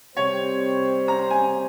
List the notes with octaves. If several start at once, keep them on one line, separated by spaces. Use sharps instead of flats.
C3 G3 C4 G4 C5 C#5
A#5
G#5